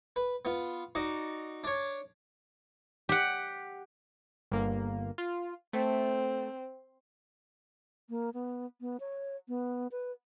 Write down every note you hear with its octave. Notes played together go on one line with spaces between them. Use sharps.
B4
B3 F4
D#4 F#4 D5
D4 C#5
G4 F#5
G1 A#3
F4
A3 C4
A#3
B3
B3
C#5
B3
B4